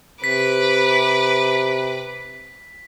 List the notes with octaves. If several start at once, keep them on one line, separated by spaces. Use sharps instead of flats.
C3 B4 D6 B6